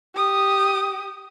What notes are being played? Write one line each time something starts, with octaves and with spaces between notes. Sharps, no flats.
G4 D#6